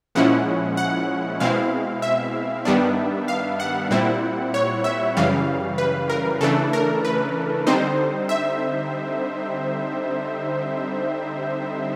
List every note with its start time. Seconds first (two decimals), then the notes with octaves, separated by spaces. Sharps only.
0.15 A#2 F3 G#3 C#4 E4 F#5
0.77 F#5
1.40 B2 G#3 C4 E4 F5
2.02 E5
2.65 G2 D#3 G3 B3 D4
3.28 F5
3.60 F#5
3.91 A#2 G3 C4 E4
4.54 C#5
4.84 E5
5.17 F#2 C#3 E3 G3 F5
5.78 B4
6.10 A#4
6.41 C#3 E3 A3 D4 A4
6.73 A#4
7.05 B4
7.67 D3 G3 C4 D#4 C5
8.29 E5